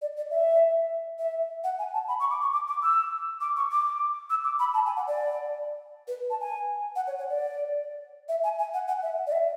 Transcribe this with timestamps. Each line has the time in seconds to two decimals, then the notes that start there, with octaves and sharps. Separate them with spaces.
0.02 D5
0.17 D5
0.31 E5
1.19 E5
1.64 F#5
1.79 G#5
1.93 A5
2.08 B5
2.20 C#6
2.31 D6
2.41 C#6
2.53 D6
2.68 D6
2.83 E6
3.41 D6
3.56 C#6
3.72 D6
4.30 E6
4.44 D6
4.59 B5
4.74 A5
4.86 G#5
4.96 F#5
5.07 D5
6.08 B4
6.30 A5
6.41 G#5
6.96 F#5
7.07 C#5
7.19 C#5
7.30 D5
8.29 E5
8.44 G#5
8.58 G#5
8.74 F#5
8.88 F#5
9.03 E5
9.27 D5
9.32 E5